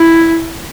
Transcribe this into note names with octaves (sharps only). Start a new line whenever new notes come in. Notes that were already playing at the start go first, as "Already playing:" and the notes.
Already playing: E4